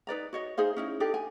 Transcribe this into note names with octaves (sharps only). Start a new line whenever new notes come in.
D#4 B4 D5 A#5
F#4 C#5 D#5
D#4 G#4 C5 F5
C#4 D#4 E4
D4 D#4 G4 A4
G#5